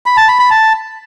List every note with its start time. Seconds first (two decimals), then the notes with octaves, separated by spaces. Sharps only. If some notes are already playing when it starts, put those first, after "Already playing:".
0.06 B5
0.17 A5
0.28 B5
0.39 B5
0.51 A5